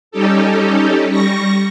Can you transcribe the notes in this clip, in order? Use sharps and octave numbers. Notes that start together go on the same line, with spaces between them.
G3 C#4 D#4 G4 A4
G3 C#6 A#6